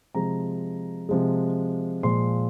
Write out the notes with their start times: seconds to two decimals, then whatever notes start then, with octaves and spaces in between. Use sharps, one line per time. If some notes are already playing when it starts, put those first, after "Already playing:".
0.15 C3 F3 G#3 A#5
1.09 C3 F3 G#3
2.03 A#2 F3 G#3 C6